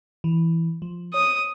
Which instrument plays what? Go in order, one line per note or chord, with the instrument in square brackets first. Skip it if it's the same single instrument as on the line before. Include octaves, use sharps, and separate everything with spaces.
[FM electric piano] E3
F3
[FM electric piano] C#5 [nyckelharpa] D#6